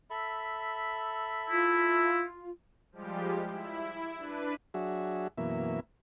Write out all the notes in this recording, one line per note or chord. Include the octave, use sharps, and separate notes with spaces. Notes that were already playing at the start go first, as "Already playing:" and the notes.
A4 E5 B5
E4 F4
F3 G3 G#3 G4
E4
D4 B4
F#3 D4 F#4 G#4 E5
F#2 B2 E3 A#3 E5